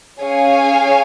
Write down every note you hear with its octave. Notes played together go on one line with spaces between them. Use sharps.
C#4 G#4 C#5 F5 G#5